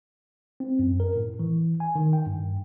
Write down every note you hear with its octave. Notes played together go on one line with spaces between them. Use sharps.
C4
F#2
A#4
A2
E3
G#5
D#3
G5
G2